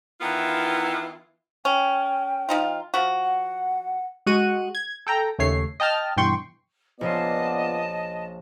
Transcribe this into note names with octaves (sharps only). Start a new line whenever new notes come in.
D#3 E3 B3 E4 F4
C#4 G5
F3 D#4 F4
F3 F#4
F#5
G#3 F#4 C#6 F#6 D#7
G#6
A4 G5 A#5
D#2 C#3 A3 C#5 C7
D#5 G5 A5 F6
G2 B2 E3 G5 C6 C#6
A#1 B3 C#4 F4 D5 D#5 A5 C6